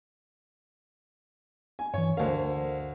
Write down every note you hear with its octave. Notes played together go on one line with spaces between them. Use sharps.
G#5
G2 E3 C#5
D2 A#4 C5 F5